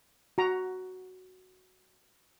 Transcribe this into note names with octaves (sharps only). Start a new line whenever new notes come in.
F#4 A#5